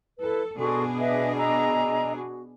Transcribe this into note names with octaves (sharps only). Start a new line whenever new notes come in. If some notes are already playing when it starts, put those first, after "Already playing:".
E4 A4 B4
B2 D4 F#4 G#4 A4 C6
B4 D#5 E5
D#5 A#5 E6
F#4